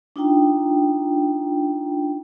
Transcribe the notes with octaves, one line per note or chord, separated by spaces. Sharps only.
D4 D#4 F4 G5 A#5